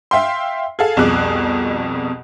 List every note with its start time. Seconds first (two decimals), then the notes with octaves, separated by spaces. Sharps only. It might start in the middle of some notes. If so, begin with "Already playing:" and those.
0.11 E5 F5 G5 C6
0.79 G#4 A4 F5
0.97 C2 F2 B2 G#4 D6 F#6